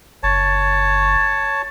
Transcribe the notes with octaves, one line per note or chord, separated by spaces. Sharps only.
F#1 C#5 A5